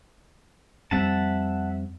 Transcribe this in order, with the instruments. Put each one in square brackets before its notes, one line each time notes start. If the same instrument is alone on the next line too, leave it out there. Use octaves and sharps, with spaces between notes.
[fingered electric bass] F2 G3 C4 [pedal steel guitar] E5 F#5 A5